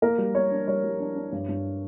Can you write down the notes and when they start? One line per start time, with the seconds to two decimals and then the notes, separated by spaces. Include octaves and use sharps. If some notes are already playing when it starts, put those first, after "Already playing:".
0.02 A#3 A#4
0.18 G3
0.35 A#3 C#5
0.52 D4
0.67 G3 C#5
0.84 G3
1.00 D4
1.16 D4
1.32 G2
1.49 G2